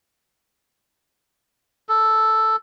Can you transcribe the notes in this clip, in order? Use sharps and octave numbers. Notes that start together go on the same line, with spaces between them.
A4